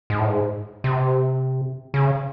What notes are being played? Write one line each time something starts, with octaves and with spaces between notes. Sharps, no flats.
G#2
A2
G#2
C3
C#3